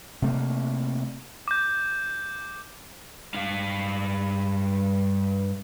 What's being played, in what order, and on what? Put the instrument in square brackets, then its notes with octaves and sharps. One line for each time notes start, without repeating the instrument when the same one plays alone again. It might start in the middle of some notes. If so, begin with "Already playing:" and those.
[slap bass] C3 A3 A#3
[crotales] D6 G6
[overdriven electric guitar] G2 F5